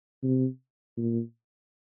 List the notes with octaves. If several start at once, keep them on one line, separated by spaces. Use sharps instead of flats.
C3
A#2